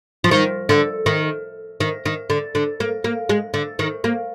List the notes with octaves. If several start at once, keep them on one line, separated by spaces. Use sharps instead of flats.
F3
D#3
D3
D#3
D#3
D#3
D3
D3
A#3
A#3
G#3
D3
D#3
A#3